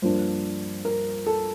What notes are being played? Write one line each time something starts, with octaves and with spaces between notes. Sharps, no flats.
G2 F3 A#3 D4 C5
A#4
A4